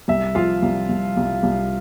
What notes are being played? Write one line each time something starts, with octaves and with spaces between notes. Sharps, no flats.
C2 E5
F3 F4 F5
C2
C2
C2
C2